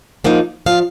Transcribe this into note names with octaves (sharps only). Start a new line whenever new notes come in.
F3 A#3 D#4 F#5
F3 F5